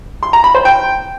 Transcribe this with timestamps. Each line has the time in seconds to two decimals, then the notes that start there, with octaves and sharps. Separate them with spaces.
0.23 C6
0.33 A#5
0.44 B5
0.55 C5
0.65 G5